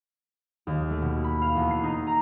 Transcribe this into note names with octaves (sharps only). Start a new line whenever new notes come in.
D#2
A3
B2
B5
F5
E2
C7
D#4
A#5